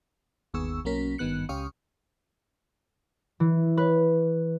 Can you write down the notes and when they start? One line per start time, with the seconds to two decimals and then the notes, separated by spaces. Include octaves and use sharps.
0.54 G1 D#2 B3 G#4 C#6 E6
0.85 B1 F#3 A#3 C#4 A#4 B6
1.18 G#1 G2 D#3 B3 F#6 C#7
1.49 C#2 C#4 G4 F5 C#6 D#6
3.40 E3
3.78 B4